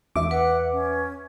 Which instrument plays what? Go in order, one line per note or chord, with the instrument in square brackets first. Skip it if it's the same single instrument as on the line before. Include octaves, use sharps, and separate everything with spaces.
[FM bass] E2 [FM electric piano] E5 D6
[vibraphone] B4 [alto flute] F#5
[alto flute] C#4